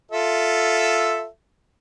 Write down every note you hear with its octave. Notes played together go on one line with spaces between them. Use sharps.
F4 A4 E5